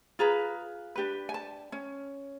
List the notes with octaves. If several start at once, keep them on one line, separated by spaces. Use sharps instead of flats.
F4 G#4 B4 A#5
D4 G4 B4
G#5
A5
C#4